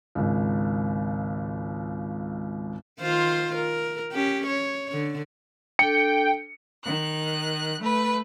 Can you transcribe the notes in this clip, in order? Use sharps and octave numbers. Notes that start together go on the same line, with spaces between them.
G#1 C#2
D#3 F4 C5
A#4
C#4 G4
C#5
D3
D4 A4 G5 C#7
D#3 F#6
A3 B4